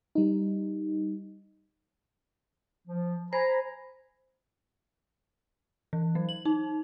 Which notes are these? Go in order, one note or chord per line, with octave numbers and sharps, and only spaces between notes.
G3 D#4
F3
C5 G#5 A#5 B5
E3
F#3
F#7
D#4